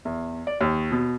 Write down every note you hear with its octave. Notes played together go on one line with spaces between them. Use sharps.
E2
D5
D#2
B2